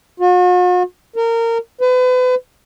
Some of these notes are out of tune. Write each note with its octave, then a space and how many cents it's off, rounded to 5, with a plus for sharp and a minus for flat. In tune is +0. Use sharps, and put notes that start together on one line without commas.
F#4 -45
A#4 -20
B4 +35